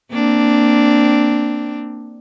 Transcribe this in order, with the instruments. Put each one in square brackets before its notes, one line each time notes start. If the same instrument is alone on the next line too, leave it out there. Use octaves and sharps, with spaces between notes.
[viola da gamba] A#3 C4 D4